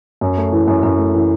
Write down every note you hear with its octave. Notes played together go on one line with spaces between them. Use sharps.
F#2
A3
E3
F#2
F#2
A3
E3